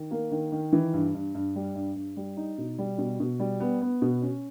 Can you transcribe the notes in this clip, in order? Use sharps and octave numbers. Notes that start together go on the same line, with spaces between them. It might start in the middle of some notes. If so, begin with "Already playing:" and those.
Already playing: D#3
A#3
D#3
D#3
E3
G2
G2
G2
G3
G2
G2
G3
D#4
B2
G3
B2
B2
G3
B3
B3
B2
C#4